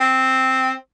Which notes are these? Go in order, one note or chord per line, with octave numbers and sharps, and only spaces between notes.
C4